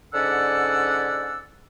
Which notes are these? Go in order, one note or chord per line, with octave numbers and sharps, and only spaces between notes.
G#2 D3 C#4 D5 F#5 E6